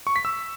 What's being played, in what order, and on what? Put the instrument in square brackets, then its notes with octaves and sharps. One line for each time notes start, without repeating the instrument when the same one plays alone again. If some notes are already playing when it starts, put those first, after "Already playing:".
[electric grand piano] C#6
B6
E6